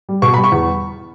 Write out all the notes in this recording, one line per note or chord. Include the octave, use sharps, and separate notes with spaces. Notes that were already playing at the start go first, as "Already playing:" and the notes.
G3
B2 C#6
G3 B5
C#6
E2